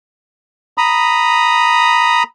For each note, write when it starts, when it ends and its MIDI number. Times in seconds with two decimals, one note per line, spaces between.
0.78 2.23 82
0.78 2.23 83
0.78 2.23 87